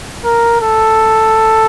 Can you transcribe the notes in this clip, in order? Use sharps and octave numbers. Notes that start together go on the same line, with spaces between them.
A#4
A4